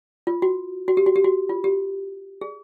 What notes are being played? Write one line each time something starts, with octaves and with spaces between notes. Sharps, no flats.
F4
F#4
F#4
G4
F#4
G4
F#4
F4
G4
G#4